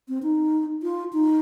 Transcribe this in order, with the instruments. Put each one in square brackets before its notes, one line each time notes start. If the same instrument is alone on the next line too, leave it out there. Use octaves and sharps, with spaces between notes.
[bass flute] C4
D#4
F4
D#4